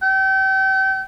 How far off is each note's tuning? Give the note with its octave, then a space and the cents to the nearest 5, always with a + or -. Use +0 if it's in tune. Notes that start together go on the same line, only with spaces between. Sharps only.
G5 -35